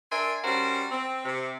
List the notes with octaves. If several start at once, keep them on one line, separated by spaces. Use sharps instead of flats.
D4 A#4 E5 G#5 C6
G3 C#4 F#4 A#4 C5
C4
C3